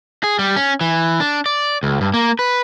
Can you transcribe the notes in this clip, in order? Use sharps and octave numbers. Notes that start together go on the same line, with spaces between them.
G#4
G3
C#4
E3
D4
D5
C#2
G2
A#3
B4